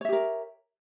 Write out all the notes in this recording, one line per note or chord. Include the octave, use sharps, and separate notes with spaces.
G4 A#4 C#5 E5